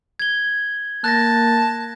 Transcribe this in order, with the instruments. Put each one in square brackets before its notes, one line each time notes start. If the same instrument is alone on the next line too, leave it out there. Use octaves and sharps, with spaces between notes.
[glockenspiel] G#6 G7
[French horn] A#3 [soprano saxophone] A5 [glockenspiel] F#6 A6 A#6